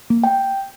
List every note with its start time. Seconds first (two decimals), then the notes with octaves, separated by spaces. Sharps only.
0.10 A#3
0.24 G5